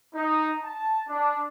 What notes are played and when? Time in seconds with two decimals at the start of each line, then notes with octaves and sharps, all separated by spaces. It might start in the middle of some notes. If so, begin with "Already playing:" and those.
0.15 D#4
0.63 A5
1.09 D4